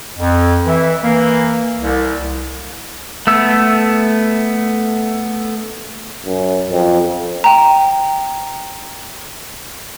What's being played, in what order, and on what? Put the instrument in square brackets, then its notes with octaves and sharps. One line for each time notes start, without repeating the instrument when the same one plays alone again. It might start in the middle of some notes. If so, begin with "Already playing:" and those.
[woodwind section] F2
E3 E5
E3 A#3
C2
[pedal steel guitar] A3 B3 E6
[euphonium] F#2
F2
[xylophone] G5 A#5